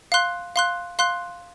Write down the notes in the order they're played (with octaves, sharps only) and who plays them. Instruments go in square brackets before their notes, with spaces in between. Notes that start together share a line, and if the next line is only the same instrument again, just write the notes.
[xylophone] F5 C6 F#6
F5 C6 F#6
F5 C6 F#6